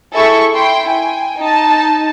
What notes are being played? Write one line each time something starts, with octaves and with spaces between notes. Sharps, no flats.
E4 G#4 A4 E5 C#6
E4 G5 C6
G5 G#5
D#4 A5